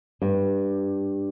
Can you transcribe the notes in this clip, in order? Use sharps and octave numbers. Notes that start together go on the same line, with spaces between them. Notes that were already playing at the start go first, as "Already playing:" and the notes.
G2